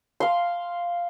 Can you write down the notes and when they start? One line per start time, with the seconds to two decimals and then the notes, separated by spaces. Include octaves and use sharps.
0.20 F5 C6